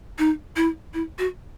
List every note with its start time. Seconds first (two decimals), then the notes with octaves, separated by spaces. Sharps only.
0.19 D#4
0.56 E4
0.94 E4
1.19 F#4